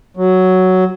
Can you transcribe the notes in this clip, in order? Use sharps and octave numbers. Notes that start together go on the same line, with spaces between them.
F#3